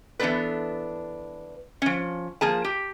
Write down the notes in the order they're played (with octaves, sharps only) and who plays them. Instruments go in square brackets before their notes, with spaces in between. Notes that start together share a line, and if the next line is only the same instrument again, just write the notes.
[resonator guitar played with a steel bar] E3 B3 C4 D4 A4 B4
F3 C#4
F3 A#3 G#4 A5
G4